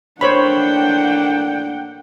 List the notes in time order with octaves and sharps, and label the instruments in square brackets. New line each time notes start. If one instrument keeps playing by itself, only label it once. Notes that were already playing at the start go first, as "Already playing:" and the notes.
[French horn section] A2 A#3 D4 [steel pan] C5 C#5 B5 [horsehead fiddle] F#5 G5